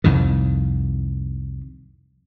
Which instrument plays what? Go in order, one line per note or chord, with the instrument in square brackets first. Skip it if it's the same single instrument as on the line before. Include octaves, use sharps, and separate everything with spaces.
[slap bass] C2 F2 A2 D#3